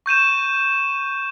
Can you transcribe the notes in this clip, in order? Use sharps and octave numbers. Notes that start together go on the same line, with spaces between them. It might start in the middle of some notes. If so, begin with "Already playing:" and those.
C#6 G6 D#7 E7